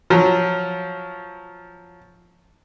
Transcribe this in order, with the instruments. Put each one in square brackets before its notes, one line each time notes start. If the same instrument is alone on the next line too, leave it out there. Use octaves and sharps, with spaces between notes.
[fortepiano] F3 F#3